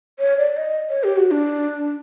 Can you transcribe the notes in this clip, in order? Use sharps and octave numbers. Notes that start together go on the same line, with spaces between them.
C#5
D5
D#5
C#5
G4
F#4
D4